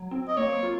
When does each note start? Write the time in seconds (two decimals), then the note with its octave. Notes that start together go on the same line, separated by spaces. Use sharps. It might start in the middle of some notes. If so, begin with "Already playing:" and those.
Already playing: F#3
0.11 C4
0.28 D#5
0.37 A#3 C#5
0.63 F4